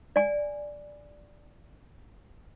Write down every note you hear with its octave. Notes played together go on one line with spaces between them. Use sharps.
D5 G#5